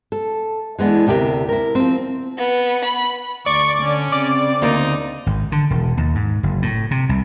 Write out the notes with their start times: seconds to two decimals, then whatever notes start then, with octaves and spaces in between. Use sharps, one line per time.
0.12 A4
0.78 E3 G#3 B3 D4
1.07 D2 C3 G4 A4 A#4 E5
1.49 E4 A#4
1.75 F3 C4
2.38 B3
2.85 B5
3.46 D2 D5 C#6
3.83 D3 C#4
4.12 C#3 C4 D5
4.62 D2 A#3 D#4
5.26 G#1
5.52 D3
5.70 E1
5.97 D#2
6.15 G#2
6.43 F#1
6.62 A2
6.91 C3
7.09 C2